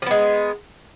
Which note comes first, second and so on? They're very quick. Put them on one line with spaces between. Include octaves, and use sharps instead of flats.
F3 B3 G#3